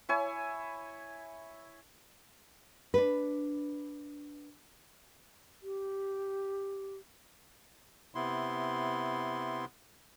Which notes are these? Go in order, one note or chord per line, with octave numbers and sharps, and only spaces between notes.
E4 C#5 G#5
D4 B4
G4
C3 B3 E4 C6